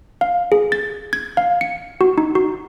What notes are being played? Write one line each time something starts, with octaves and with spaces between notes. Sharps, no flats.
F5
G#4
A6
G#6
F5
C#7
F#4
D#4
F#4